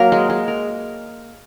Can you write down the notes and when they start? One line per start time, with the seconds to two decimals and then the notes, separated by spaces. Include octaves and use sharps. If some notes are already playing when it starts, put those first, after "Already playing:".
Already playing: F#3 A#3 A#4
0.12 G#3
0.30 G#3
0.48 A#4